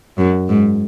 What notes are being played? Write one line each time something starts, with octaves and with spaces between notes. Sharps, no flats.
F#2
G#2